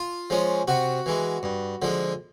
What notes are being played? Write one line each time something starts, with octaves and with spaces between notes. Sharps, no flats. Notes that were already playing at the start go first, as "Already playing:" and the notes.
Already playing: F4
F3 G#3 C#4
C3 F#4
E3 G#3
G2
D3 F3 G#3